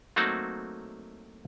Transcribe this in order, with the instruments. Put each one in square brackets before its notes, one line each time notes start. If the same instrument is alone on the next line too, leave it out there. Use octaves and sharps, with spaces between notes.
[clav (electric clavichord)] F#3 A3 A#3 C4 D#4 F#4